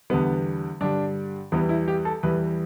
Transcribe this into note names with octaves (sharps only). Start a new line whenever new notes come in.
E2 D3 G3 B3
G2 D3 G3 D4
E2 E3 G3 B3
E4
G4
A4
E2 E3 G3 B4